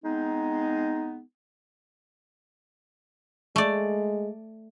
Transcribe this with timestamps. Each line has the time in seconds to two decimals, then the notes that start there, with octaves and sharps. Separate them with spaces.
0.03 G#3 B3 C4 D#4
3.56 G#3 A3 D5